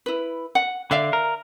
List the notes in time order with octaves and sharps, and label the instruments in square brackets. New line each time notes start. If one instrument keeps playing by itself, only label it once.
[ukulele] E4 B4
F#5
[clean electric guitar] D3 [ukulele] D5 E5 F5
[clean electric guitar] A#4